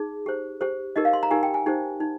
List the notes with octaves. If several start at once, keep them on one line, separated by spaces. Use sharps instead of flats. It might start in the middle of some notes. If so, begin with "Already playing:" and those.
Already playing: D#4 G#4
G4 C5
G4 C5
D#4 G4 A#4 D#5
F5
C6
A#5
D#4 G4 A#4 G#5
G5
G#5
D#4 G4 C5
D#4